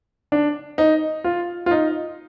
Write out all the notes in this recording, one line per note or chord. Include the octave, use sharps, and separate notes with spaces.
D4
D#4
F4
F4
D#4